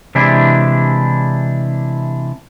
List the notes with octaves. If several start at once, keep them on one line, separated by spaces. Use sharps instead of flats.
C3 E3 G#3 D4 E4 G4